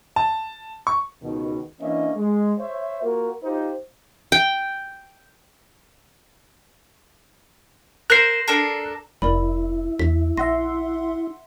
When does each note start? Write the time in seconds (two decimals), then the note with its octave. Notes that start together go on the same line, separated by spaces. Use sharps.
0.16 A5
0.87 C#6
1.23 C#2 B2 D#3
1.81 E3 A#3 C#4 D4 D#5 E5
2.17 G#3
2.60 C5 C#5 E5
3.03 A#3 F4 F#4 A#4
3.44 D#4 F4 G4 C5
4.32 G5
8.10 A#4 C5 F#6 C7
8.48 D4 A4 A#4
9.22 F1 E4 A#4 D5 B5
9.99 E2 B6
10.37 A#1 E5 F#5 C6 A#6